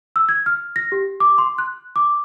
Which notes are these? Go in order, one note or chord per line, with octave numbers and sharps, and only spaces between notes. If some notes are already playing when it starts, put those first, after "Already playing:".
E6
G#6
F6
A#6
G4
D6
C6
F#6
D6